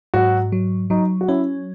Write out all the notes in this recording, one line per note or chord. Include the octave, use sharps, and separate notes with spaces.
G#2 F#3 F#4
F#3
F#3 D#4
F#4
C#4 E4